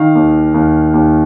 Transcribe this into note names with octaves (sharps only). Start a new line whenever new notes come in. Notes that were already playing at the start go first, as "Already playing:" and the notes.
Already playing: D#3 F5
D#2
D#2
D#2